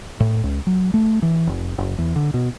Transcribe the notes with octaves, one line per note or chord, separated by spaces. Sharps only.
A2
C#2
F#3
A3
E3
F1
F#1
E2
D3
B2